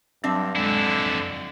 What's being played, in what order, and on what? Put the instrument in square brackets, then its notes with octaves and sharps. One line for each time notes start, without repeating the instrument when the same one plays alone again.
[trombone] G2 [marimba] F#3 A#6 [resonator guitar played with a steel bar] C4 D4 E5
[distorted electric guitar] F2 E4 [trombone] D3 [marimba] G#3